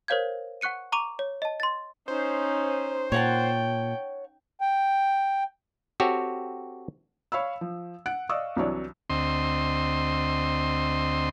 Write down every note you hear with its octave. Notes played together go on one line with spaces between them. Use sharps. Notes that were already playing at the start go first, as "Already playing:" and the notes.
A#4 C5 C#5 F5 G6 G#6
F#5 C#6 F#6 C#7 D#7
A#5 C#6 D6 D#7 F7
C#5
D#5 A5
C6 A6
C#4 D#4 C5
A#2 C#5 F#5 G5 A5
G5
C4 F#4 G4 A4 C#5
C#5 F5 B5 E6
F3
F#5 F#6 D7
D5 D#5 F5 C#6 D#6 E6
C2 E3 F#3 D4 C#5 D5
D2 C4 D#5 C6